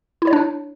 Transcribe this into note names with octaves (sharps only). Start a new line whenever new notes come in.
E4
C#5
D4